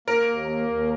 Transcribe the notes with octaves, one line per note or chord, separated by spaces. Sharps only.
A#3 A#4
D#2
A#3
D#2